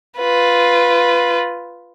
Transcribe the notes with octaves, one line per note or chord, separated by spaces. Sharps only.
F4 B4